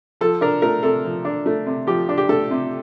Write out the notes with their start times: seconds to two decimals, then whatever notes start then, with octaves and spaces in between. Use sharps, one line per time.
0.21 F3 A4
0.41 D4 A#4
0.62 A3 A#4
0.83 C3 A4
1.04 F3
1.25 D4
1.46 A3
1.66 C3
1.87 F3 G4
2.09 D4
2.18 G4
2.29 A3 A4
2.51 C3